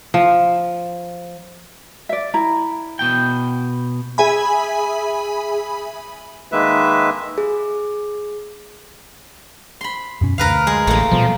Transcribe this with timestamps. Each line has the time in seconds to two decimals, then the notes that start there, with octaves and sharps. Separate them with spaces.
0.14 F3
2.09 D5 E5
2.34 E4 A#5
2.99 B2 G5
4.18 G#4 E5 G#5 B5
6.52 D#3 G#3 A#3 B4 E5
7.38 G#4
9.81 B5 C6
10.21 F#2 B2 C#4
10.38 D2 A#4 B4 F5
10.67 G#3
10.87 A1 A3 A#3
11.11 A#1 B2 F3 G3